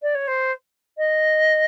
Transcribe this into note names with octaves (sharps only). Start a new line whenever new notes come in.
D5
C#5
C5
D#5